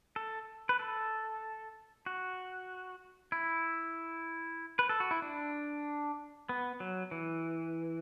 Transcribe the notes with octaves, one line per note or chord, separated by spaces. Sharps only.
A4
B4
A4
F#4
E4
B4
A4
F#4
E4
D4
B3
F#3
E3